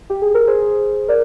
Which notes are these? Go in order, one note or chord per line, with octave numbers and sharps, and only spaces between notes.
G4
G#4
A#4
G#4 C5
A#4 D5